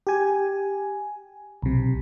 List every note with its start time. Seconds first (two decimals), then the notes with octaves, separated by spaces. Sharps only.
0.07 G4 G#5
1.62 B1 C3